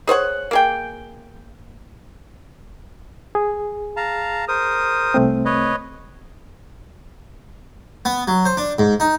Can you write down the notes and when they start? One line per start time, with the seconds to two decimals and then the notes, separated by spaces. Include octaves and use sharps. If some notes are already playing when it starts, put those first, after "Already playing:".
0.07 G#4 C5 C#5 F#5
0.51 A#3 G#4 G5
3.35 G#4
3.97 F5 A5 A#5
4.48 A#4 C5 D#6
5.14 C2 A3 C4
5.45 B4 C#5 D#5
8.05 B3
8.28 F#3
8.45 C5
8.57 D4
8.79 G#2
9.00 D#4